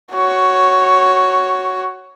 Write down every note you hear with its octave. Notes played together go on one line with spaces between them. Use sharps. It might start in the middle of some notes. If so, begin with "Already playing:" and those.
F#4 C#5